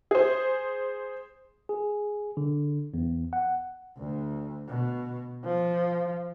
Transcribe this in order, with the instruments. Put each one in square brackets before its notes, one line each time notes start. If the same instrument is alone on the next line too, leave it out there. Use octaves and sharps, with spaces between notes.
[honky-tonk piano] G#4 C5
[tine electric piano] G#4
D3
E2
F#5
[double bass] D2
B2
F3